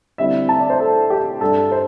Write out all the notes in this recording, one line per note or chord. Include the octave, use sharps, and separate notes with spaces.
D3 G3 C4 E4 E5
A5
D5
C5
A4
G4
G2 G3 D4 A4
C5